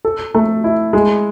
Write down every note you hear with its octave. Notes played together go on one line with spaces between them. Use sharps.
A4
A3
E4
G#3